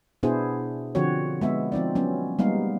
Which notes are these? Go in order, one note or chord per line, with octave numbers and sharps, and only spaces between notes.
B2 B3 D4 E4 G#4 C5
D3 F3 C4 F#4 C#5
G#3 B3 E5
F3 C4 D#4 D5
F#3 B3 C#4
G3 G#3 A#3 B3 D#4 F5